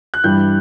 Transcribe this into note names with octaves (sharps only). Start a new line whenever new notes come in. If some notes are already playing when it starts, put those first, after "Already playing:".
F#6
G2 E3 G3 G6